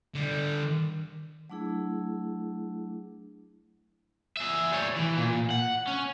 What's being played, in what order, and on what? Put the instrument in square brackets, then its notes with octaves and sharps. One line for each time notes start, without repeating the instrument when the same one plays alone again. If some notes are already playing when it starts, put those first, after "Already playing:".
[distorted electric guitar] D3 G3
[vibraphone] F#3 A3 D4 E4 G#4
[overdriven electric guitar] G#4 E5
G3 C#5
E3
A#2
F#5
C#4